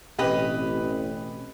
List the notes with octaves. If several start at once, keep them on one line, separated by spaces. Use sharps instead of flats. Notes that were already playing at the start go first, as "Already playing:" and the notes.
A1 B2 C4 C#4 G4 B4 D#5